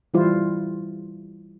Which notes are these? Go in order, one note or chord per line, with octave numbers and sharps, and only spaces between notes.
E3 G3 E4 F4 C5